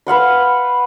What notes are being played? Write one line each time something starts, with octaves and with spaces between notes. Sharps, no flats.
B4 F5 F#5 C6